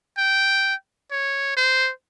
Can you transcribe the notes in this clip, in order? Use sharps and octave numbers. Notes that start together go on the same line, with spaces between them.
G5
C#5
C5